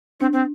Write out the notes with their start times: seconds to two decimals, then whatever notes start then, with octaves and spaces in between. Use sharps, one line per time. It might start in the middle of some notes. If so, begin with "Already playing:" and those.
0.20 C4 D4
0.33 C4